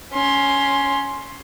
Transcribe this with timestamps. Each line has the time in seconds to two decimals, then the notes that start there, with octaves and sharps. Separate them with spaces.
0.14 C#4 C6